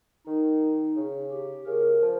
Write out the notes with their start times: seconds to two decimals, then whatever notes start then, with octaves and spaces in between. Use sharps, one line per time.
0.27 D#3 D#4
0.97 C#3
1.32 G4
1.66 C#3 A#4
2.02 F3